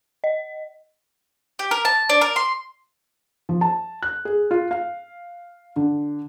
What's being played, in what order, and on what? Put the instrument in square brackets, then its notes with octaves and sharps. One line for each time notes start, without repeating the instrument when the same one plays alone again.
[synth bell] D#5
[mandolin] G4
A#4
A5
D4
A#4
C6
[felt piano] F3
A5
F#6
G#4
F4
F5
D3